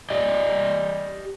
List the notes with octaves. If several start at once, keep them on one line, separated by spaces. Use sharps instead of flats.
G4 D5 D#5